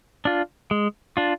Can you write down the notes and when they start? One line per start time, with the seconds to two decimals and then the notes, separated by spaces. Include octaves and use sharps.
0.25 D4 F4
0.71 G#3
1.17 D4 F4